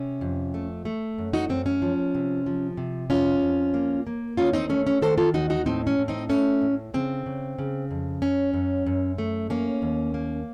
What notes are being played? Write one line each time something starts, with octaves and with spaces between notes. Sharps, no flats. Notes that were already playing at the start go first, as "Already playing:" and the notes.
Already playing: C3 C#4
F2
A3
A3
F#2
D#4 F#4
F#2 C4
C#4
F3
C3
F3
C3
F2 C#4 F4
F2
A#3
A#3
D#2 C#4 F4
C4 D#4
A3 C#4
C#4
D#3 A4 C5
F4 A4
D#2 D#4 F#4
D#4 F#4
A2 C4 D#4
C#4
A2
C4 D#4
A3 C#4
A2
C#3 C4
C#3
C#3
F2
F#2 C#4
F#2
F#2
A3
A#3 C#4
D#2
A#3